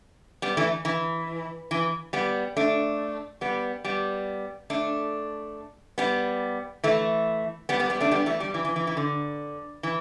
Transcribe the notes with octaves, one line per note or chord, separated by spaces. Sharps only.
G3 B3
E3 A3
E3
E3
G3 B3
A3 D4
G3 B3
G3 B3
A3 D4
G3 B3
E3 A3
G3 B3
G3 B3
G3 B3
A3 D4
G3 B3
E3 A3
G3
E3
E3
E3
E3
D3
E3